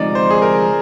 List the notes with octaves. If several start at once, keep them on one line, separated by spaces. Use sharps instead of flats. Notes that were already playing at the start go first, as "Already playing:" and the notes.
Already playing: D2 C3 F3 G#3 D#4 D5
C5
G#4
A#4